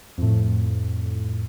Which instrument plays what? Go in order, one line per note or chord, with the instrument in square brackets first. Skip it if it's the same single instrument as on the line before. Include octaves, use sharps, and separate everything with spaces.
[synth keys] F2 A2